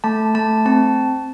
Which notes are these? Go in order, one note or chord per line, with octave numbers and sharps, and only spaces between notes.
A3 A5
A3 A5
C4 A5